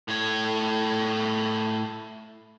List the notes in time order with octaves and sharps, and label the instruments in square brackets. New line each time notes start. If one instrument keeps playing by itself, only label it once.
[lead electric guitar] A2 C#5